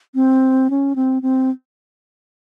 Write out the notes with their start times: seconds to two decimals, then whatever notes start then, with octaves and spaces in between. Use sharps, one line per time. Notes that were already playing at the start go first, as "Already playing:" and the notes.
0.15 C4
0.70 C#4
0.96 C4
1.22 C4